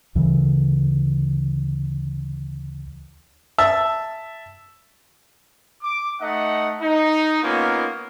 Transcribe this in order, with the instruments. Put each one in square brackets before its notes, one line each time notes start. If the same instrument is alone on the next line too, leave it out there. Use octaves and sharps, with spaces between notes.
[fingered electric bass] D2 C#3 E3 F#3
[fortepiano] E5 A5 E6
[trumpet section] D6
A3 D#4 D#5 F#5
D#4
A#3 B3 C#4 D#4 F4